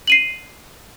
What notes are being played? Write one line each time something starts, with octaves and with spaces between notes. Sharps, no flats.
C7 D#7 F#7